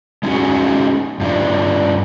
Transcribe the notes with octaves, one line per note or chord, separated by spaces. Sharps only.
G#3 C#4 D#4 F#4 G#4
G2 F3 D4